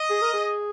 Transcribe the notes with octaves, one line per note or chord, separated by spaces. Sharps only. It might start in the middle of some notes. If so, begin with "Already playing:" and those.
Already playing: D#5
G#4
A#4
G#4